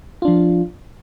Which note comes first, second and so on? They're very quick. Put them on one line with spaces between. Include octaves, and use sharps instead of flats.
F4 D4 F3